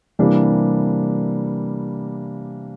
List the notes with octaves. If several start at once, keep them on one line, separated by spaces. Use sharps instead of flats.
C3 E3 G3 A#3 D4